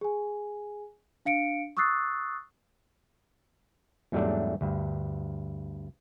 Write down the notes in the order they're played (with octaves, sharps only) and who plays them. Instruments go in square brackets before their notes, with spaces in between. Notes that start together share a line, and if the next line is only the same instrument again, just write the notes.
[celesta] G#4 G#5
D4 F5 C#7 D7
C#6 D#6 E6 F#6 A6 C7
[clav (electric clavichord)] E2 G#2 F#3 G3 A3 D4
D2 G2